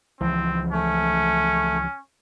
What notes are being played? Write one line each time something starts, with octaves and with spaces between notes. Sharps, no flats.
C#2 E3 F3 C4
A3 C#4